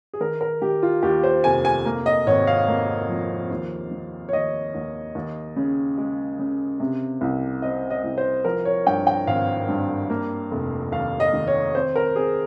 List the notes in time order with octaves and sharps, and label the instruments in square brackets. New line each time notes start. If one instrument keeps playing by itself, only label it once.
[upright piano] G#4
D#3 A#4
A#4
D#3 G4
F4
D#2 G4
C5
F1 G#5
G#5
A#3
D#5
G#1 C#5
F5
A#3
F3
D#2
D#3
C#5
D#2 D#5
D#2
D#2
C#3
G#3
C#3
C3
C2
C4 D#5
D#5
C2
C5
F3 A#4
C#5
G2 G5
G5
G#1 F5
G2
A#3
F1
D#2 F5
D#5
D#3
C#5
C4 C5
A#4
C4 G#4